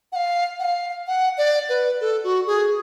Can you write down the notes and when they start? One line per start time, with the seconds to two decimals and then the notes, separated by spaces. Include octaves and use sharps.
0.12 F#5
0.16 F5
0.59 F#5
0.64 F5
1.07 F#5
1.37 D5
1.69 B4
2.01 A4
2.24 F#4
2.47 G#4